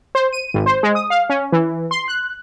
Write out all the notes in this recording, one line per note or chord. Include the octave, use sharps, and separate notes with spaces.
C5
D#7
G#1
C5
G#3
D#6
F5
C#4
E3
C6
F#6